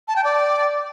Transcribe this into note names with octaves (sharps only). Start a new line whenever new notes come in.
A5
G5
D5